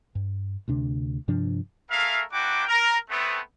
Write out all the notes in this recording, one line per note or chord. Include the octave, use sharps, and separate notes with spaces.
G2
D2 C3 D4
G2 C3 F3 D4
A3 G#4 A#4 E5 F5
A#3 D4 E4 F#4 G5 D6
A#4
A3 B3 C4